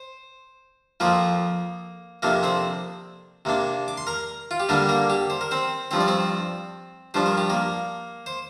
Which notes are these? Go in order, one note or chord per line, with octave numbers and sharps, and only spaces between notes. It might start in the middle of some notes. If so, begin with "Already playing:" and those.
Already playing: C5
F2 F3 A#3 C4 A#4
F2 C3 A#3 D4 A#4
C4 C5
C3 A#3 D4
D6
C6
A#4 A#5
F4
G4
D3 G3 A#3 D4 A#4
A#3 A#4
G4
C5
A#4
C4 C5
G2 F3 C4 C5
D5
C4 C5
G2 F3 D4 C5
A#4
G4
A#3 A#4
C5